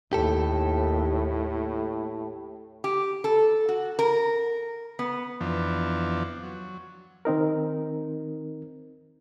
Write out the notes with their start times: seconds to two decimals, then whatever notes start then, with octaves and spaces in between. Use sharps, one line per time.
0.13 D#2 A2 G4 A4
2.84 G4
3.24 A4
3.69 F#4
3.99 A#4
4.99 B3
5.40 F2 E3 F3 B3 D4
6.43 F#3
7.25 D#3 C4 D#4 A#4